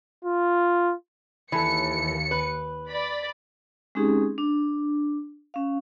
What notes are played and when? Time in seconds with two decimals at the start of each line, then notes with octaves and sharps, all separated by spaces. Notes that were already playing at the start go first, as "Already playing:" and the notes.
0.25 F4
1.52 D#2 E3 A4 C#7
2.31 B4
2.89 D5 B5
3.95 G#3 C4 C#4 D#4 G4 G#4
4.38 D4
5.54 C#4 F5